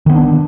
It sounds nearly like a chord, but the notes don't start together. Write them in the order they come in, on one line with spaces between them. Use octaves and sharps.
D#3 B3 C4 D4